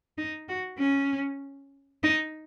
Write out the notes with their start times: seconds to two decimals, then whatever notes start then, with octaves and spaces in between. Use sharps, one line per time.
0.18 D#4
0.49 F#4
0.79 C#4
2.03 D#4